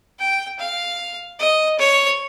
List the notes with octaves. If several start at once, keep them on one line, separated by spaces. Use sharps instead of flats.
G5
F5
D#5
C#5